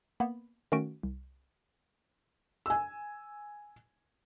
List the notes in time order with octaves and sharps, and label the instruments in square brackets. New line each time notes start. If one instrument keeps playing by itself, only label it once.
[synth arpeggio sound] A#3 B3 B5
D#3 A3 C#4 F#4 D7
C2
[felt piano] G#5 E6